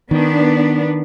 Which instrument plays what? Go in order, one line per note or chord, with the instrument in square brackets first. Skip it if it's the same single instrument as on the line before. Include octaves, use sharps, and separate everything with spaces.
[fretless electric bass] D#3 [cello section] B3 D4